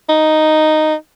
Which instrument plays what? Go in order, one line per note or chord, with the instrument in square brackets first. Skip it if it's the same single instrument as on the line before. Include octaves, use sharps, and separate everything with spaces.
[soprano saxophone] D#4